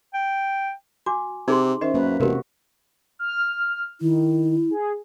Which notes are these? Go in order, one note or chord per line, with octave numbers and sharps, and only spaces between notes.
G5
F#4 G#5 D6
C3 D#4 G#4 C6
D#3 C#4 C5 D#5 E5
F#2 A#3 B4
E1 C3 F#4 G4 A#4 B4
F6
D#3 E4
G#4